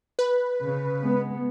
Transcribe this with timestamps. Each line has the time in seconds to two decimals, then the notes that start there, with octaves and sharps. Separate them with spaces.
0.19 B4
0.64 C#3
1.01 G#3 B3